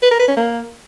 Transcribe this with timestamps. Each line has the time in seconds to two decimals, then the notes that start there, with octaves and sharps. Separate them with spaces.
0.02 B4
0.11 A#4
0.20 B4
0.28 C#4
0.37 A#3